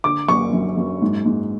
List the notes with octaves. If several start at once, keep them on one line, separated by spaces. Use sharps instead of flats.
D3 D6
F#2 C#6
F#2
F#2
G#2
G#2